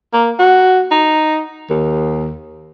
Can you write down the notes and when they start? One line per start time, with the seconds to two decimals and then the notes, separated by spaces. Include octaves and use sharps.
0.13 A#3
0.39 F#4
0.91 D#4
1.70 D#2